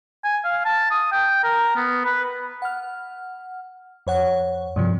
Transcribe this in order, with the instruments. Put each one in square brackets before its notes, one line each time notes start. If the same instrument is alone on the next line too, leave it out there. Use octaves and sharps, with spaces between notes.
[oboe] G#5
F5
A5
D#6
G5
A#4
B3
B4
[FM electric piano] F#5 F6
F2 C#5 F#5
G2 C3 F3